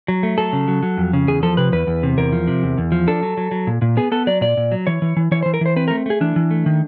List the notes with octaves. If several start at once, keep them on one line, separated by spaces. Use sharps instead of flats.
F#3
A3
F#3 A4
C#3
F#3
F#3
F2
C#3
E2 G#4
F3 A4
C3 B4
E2 B4
E2
C3
E2 A#4
F3
C3
E2
E2
F3
D4 A4
F#3
F#3
F#3
A#2
A#2
B3 G#4
B3 A4
F#3 D5
A#2 D5
A#2
F#3
E3 C#5
E3
E3
E3 C#5
C5
E3
A#4
E3 C5
C4 B4
A#4
A3
A3 G#4
E3 D4
E3
A3
D#3